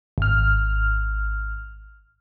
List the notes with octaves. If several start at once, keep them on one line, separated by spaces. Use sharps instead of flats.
G#1 F6